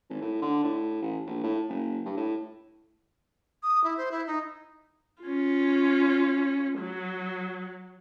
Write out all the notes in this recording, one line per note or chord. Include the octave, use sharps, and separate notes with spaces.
G#1
A2
D3
A2
A1
A#1
A2
F#1
G2
A2
D#6
E4
C5
E4
D#4
C#4 F4
F#3